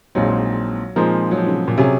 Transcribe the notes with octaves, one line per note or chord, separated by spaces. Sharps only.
A#1 A#2 F#3 G#3 C4 D#4
A#2 F3 G#3 C4 D#4 A#4
F#3
F3
C#3
C#3
A#2
C3 F#3 C#4 G#4